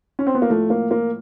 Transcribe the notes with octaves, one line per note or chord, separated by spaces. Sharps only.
C#4
C4
B3
A#3
A2 F3 A3
A#3
A#3